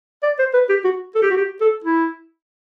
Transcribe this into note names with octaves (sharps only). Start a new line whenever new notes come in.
D5
C5
B4
G4
F#4
A4
G4
F#4
G4
A4
E4